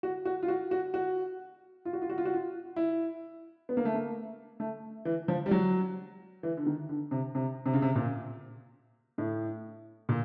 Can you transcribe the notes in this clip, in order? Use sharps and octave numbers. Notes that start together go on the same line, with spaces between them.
F#4
F#4
F4
F#4
F#4
F#4
F4
F#4
F4
F#4
F4
F#4
F4
E4
B3
A#3
A3
A#3
A3
E3
F3
G3
F#3
E3
D3
D#3
D3
C3
C3
C3
C#3
C3
A#2
A2
A#2